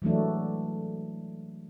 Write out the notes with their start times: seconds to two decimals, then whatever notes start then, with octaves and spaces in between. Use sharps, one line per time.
0.02 E3 F#3 G#3 A3 D4